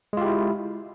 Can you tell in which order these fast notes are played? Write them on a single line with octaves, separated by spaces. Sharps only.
G#3 F4 G4 E4